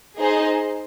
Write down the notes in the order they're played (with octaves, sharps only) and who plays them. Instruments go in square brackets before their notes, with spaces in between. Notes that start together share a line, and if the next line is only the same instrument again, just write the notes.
[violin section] D#4 G#4 C5 D#5